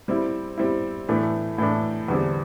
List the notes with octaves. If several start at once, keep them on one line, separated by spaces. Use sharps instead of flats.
G3 C4 E4
G3 C4 E4
A2 E3 A3 D4
A2 E3 A3 D4
E2 D3 G3 C4